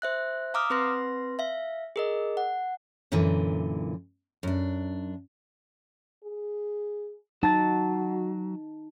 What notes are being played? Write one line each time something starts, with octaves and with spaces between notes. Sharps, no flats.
C5 E5 F#6
F5 A#5 D6 D#6 F6
C4 B4 C6 A#6
E5 F5
G#4 A#4 D#5
F#5
F#2 A#2 D3 E3
F#2 D4
G#4
F#3 D#4 F#4 A5 A6